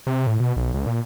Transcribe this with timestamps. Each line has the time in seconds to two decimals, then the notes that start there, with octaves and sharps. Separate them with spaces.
0.07 C3
0.27 A2
0.40 B2
0.56 B1
0.74 C#2
0.86 A#2